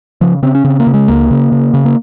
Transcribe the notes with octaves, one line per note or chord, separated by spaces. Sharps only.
C#3 F3
C#3 C4
C#4
C#3 C4
A#3
C#3
G#3
C#2 A#3
C#3
C#3
C#3
A#3